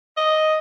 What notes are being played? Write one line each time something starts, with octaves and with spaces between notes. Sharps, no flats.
D#5